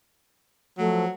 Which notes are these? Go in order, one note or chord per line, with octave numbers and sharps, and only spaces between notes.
F3 F#3 A3